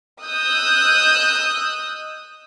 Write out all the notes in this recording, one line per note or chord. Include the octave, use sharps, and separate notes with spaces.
D#5 D#6 E6 F#6 G6